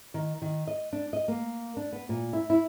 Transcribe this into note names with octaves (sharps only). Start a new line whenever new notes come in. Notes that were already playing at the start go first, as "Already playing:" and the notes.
D#3
D#3
D#5
D4
D#5
A#3
D4
B3
A#2
E4
E4